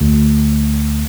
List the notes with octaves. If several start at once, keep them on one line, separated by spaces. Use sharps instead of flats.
D2